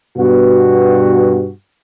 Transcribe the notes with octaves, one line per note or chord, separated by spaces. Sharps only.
G2 B2 B3 F#4